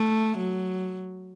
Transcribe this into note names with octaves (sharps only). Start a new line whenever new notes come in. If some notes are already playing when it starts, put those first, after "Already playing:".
Already playing: A3
F#3